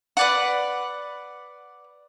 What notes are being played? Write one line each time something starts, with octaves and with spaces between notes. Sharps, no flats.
B4 D5 F#5